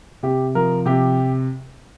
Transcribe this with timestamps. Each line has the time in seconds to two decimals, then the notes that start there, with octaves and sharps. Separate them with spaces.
0.23 C3 G4
0.55 F3 A#4
0.86 C3 G4